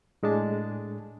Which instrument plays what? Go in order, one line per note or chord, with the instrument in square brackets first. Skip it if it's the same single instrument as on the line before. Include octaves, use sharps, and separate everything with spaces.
[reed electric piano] A2 G#3 D4 A5